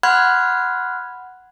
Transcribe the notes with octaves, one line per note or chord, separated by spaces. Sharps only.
F#5 B5 C6 F6 F#6 G#6